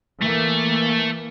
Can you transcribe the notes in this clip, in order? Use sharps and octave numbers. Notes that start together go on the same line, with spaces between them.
E3 A3 A#3